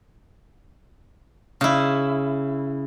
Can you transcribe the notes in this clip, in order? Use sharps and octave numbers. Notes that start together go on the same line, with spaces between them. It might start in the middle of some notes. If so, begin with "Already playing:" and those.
C#3 E4